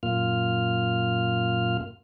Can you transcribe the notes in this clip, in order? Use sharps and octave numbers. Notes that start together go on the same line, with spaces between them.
F#2 A#2 A#3 F4 F6